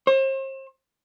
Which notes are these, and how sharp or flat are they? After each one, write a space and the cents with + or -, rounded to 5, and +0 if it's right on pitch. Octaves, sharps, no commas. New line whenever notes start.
C5 +40